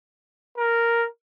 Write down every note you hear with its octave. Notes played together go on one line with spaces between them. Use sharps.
A#4